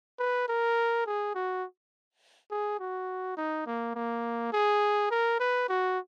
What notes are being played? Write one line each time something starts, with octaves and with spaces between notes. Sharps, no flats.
B4
A#4
G#4
F#4
G#4
F#4
D#4
A#3
A#3
G#4
A#4
B4
F#4